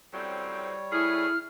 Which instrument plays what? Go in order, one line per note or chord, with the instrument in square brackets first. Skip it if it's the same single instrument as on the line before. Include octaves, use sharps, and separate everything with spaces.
[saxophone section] F#2 A2 C4 [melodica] G3 C#5
[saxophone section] A3 G#4 [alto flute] E4 [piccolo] F6